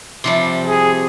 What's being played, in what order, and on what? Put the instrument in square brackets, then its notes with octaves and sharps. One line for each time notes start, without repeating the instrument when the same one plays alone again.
[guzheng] C3 F3 G3
[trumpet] G#4